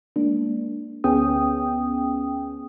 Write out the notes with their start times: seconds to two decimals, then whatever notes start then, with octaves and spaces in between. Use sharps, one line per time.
0.16 G#3 A#3 D4
1.04 D2 B3 C#4 G#4 G5 D#6